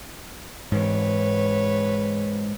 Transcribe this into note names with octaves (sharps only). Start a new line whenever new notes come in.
G#2 E3 B4 C#5